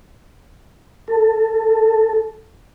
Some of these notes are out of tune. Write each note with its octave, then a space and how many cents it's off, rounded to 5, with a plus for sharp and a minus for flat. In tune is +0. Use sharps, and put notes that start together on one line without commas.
A4 +15